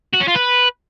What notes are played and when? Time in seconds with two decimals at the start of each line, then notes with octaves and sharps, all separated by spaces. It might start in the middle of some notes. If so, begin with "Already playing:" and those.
0.14 F#4
0.21 C#4
0.28 F4
0.35 B4